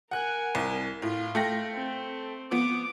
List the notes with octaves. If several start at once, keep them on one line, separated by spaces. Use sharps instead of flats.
A#4 F#5 G#5 F#6
C2
A2 F4
A3 G5 A#6
C4
F3 B3 D6